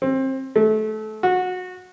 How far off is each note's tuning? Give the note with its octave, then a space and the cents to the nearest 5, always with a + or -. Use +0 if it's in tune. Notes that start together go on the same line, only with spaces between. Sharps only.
C4 +25
A3 -25
F#4 -20